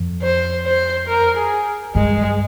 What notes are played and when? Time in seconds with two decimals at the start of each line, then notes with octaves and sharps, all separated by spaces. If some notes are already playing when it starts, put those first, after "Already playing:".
Already playing: F2
0.22 C5
0.66 C5
1.08 A#4
1.37 G#4
1.95 G2 G#3